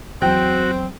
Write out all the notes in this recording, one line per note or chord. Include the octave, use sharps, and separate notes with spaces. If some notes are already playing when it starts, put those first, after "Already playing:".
E2 F#3 C4 F#4 G5